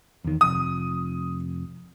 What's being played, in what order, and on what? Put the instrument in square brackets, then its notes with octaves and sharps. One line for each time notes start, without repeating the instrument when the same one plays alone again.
[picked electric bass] E2 D#3
[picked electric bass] F1 F2 [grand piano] D#6